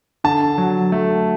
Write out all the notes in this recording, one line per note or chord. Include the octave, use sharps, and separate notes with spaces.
D3 A5
F#3
A3